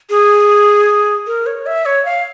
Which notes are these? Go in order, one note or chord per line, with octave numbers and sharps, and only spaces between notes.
G#4
A#4
C#5
E5
C#5
F5